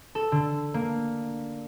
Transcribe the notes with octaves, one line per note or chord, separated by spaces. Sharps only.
A4
D3
A#3